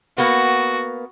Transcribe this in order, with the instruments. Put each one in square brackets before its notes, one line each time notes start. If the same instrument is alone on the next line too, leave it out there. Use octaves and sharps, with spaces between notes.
[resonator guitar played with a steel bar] A#3 B3 [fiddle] F#4